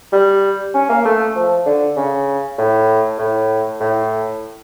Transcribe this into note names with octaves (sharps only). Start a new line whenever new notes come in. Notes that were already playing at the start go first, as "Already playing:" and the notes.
G3
C#4
A#3
A3
F3
D3
C#3
A2
A2
A2